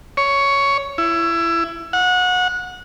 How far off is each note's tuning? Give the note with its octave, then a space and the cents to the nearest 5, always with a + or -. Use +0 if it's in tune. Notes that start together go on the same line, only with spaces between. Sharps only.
C#5 +10
E4 +25
F#5 -25